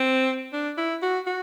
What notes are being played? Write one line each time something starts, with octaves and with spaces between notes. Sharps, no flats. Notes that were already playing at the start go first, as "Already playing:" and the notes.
Already playing: C4
D4
E4
F#4
F#4